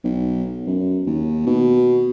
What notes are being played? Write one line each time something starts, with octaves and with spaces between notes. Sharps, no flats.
B1
F#2
D#2
B2